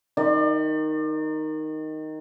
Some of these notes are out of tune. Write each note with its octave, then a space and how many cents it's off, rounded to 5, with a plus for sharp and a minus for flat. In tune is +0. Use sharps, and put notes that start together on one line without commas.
D#3 +0 D5 +35